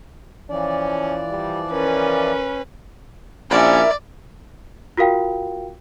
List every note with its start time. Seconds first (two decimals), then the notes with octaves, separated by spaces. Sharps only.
0.50 E3 F3 C#4 D5
1.30 G3
1.71 C#4 A#4 B4
3.51 A#1 C#4 E4 A#4 D5 E5
4.97 F4 F#4 A#4 F5 G5